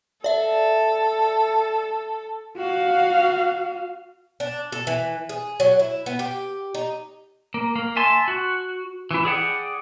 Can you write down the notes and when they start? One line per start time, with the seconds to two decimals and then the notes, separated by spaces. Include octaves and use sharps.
0.24 A4 D5 E5
2.57 F#4 F5
4.40 D4
4.72 A4
4.87 E3
5.29 G#4
5.60 F#3
5.79 E4
6.06 B3
6.19 G4
6.74 D#4
7.54 A#3
7.76 A#3
7.96 E5 G#5 A5 C6
8.28 F#4
9.11 E3 E4
9.25 G#4 D5 F#5 G5